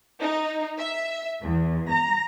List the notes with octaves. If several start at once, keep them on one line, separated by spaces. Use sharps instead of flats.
D#4
E5
E2
A#5